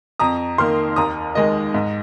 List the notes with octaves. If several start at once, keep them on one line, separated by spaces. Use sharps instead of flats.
F2 A#5 D#6
D#3 A#3 C6 F6
D#2 A#5 D#6
D#3 G#3 D#5
G#2